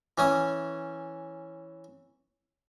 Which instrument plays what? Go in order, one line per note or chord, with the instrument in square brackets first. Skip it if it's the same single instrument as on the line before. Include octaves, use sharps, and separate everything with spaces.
[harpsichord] E3 C#4 D#6